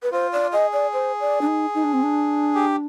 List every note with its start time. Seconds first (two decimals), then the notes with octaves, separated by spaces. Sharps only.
0.03 B4
0.12 F4 C5
0.32 D5
0.52 G#4 D#5
0.73 D5
0.93 C5
1.20 D5
1.41 D4
1.47 D#4
1.75 D#4
1.84 D4
1.93 C4
2.03 D4
2.55 G4